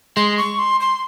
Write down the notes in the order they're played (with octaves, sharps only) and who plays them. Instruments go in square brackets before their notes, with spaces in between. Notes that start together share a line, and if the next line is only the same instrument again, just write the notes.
[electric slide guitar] G#3 [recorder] C6
[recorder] C#6
C6
C6